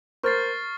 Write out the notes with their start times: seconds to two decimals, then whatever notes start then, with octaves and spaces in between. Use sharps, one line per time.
0.23 A#4 C5 C#6 F6 A6 C7